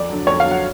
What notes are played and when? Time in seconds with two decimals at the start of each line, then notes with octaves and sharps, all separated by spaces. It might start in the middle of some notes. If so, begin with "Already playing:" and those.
Already playing: F2 D5
0.10 D3 F#3
0.27 F2 C#5
0.40 F5
0.46 D3 F#3
0.51 F#5